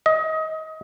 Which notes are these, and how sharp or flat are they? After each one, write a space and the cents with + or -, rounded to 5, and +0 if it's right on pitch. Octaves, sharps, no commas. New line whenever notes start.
D#5 +25